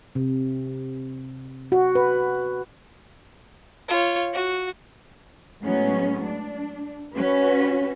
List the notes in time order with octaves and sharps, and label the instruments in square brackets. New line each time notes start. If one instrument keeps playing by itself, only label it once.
[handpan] C3
F#4
B4
[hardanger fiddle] F4 C#5
F#4
[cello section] A2 F#3 G#3 B3 C#4
D4
C#4 F#4 B4